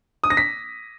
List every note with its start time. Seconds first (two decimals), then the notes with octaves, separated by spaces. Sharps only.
0.24 D#6
0.30 A#6
0.37 B6